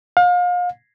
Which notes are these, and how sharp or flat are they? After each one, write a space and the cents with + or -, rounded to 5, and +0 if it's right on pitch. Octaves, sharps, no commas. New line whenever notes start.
F5 +35